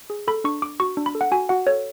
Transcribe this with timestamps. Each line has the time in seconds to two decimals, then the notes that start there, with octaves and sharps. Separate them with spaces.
0.10 G#4
0.28 A4 B5
0.44 D4 C#6
0.62 D4 D6
0.80 F#4 C#6
0.97 D4
1.06 B5
1.15 A4
1.21 F#5
1.32 F#4 G#5
1.49 F#4 F#5
1.67 A4 C#5